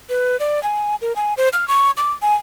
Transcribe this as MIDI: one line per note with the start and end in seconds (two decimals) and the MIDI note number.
0.09 0.37 71
0.40 0.62 74
0.63 0.95 80
1.02 1.15 70
1.16 1.34 80
1.37 1.49 72
1.53 1.67 89
1.68 1.91 85
1.97 2.12 86
2.22 2.35 80